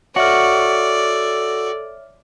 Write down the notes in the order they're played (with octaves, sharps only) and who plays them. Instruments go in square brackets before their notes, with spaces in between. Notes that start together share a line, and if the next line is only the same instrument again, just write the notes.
[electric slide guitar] F#4 [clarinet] A4 [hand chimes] C#5 E5 F6 [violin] D5